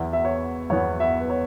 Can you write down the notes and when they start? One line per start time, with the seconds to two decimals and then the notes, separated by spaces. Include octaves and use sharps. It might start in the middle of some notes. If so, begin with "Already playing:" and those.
Already playing: E2 E3 B3 E4 B4
0.13 E5
0.25 C#5
0.70 E2 E3 B3 E4 C#5
1.00 E5
1.21 B4
1.30 C#5